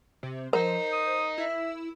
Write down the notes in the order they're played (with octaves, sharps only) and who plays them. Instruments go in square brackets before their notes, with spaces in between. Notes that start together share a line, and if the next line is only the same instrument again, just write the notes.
[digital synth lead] C3
[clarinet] F3 [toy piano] A#4 [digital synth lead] C5 [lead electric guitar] D#5 A#5
[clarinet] D#6
[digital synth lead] E4 [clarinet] E5